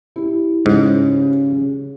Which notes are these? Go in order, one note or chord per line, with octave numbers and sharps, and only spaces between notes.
E4 G4
G#2 C#3